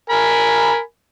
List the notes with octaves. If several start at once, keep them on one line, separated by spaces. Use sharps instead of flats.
A#4 G#5 B5